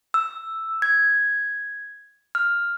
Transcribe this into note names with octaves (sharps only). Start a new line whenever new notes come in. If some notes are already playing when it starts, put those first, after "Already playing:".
E6
G#6
F6